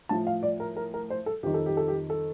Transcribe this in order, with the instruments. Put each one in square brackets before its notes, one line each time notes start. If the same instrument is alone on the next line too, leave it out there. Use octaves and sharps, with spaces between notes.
[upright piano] A2 F3 A5
F5
D5
A#4
A#4
A#4
C5
A4
F2 D#3 G4
A4
G4
A4
G4
A4